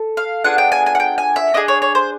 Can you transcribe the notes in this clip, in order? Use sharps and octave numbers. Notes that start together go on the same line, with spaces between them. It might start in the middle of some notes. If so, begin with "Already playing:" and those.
Already playing: A4
F5
B3 D4 F4 G#4 F#5
G5
G#5
G#5
F#5
G5
G#5
E5
D4 F4 G#4 D#5
C#5
C#5
C5